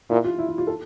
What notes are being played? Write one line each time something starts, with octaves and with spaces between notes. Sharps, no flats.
A#2 E4
F4
E4
E4
F4
A4